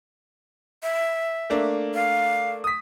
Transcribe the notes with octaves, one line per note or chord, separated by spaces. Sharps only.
E5
A3 A#3 D4
F5
D#6 B6